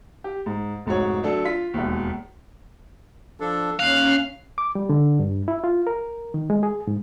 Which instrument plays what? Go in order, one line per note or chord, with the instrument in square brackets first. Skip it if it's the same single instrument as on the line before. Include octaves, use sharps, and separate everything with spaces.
[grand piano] G4
G#2
F1 G#2 F#4 C#5
F#3 A3 D4 A4
F4 B6
E1 D#2
[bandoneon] F3 D4 A4
[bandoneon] D#2 F#6 [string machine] C#4 [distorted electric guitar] F5
[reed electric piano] D6
G3
D3
G2
E4
F4
A#4
D#3
G#3
G#4
G#2